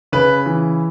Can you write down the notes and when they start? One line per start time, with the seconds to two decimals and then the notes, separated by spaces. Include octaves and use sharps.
0.12 C#3 B4
0.46 E3